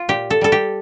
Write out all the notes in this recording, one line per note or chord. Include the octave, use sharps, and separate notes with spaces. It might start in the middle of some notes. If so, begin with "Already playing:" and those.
Already playing: F4
A#2 G4
A4
G3 A4
G4